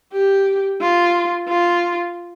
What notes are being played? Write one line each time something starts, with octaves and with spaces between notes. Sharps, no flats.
G4
F4
F4